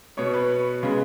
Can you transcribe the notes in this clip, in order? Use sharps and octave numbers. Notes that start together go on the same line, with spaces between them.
B2 B3 C#5
B4
C#3 G#3 B3